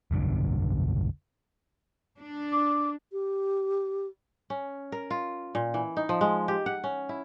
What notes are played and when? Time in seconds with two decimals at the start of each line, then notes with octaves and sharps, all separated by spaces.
0.11 F1 B1 G2 D3
2.19 D4
2.52 D6
3.12 G4
4.50 C#4
4.92 A#4
5.11 F4
5.55 A#2
5.74 E3
5.97 D#4
6.09 F3
6.21 G#3
6.48 G4
6.66 F#5
6.84 C#4
7.09 E4